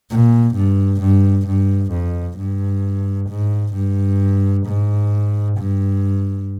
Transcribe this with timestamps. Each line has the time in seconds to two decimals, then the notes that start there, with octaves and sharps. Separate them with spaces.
0.10 A#2
0.55 G2
1.01 G2
1.47 G2
1.92 F2
2.38 G2
3.30 G#2
3.75 G2
4.66 G#2
5.58 G2